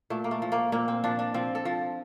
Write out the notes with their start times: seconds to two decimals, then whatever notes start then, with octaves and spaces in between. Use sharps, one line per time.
0.10 A#2 A3
0.24 A#3
0.31 A3
0.42 F3
0.52 A#3
0.72 A#2 A#3
0.88 C4
1.04 F3 D4
1.19 D4
1.34 F3 C4
1.55 A4
1.65 F3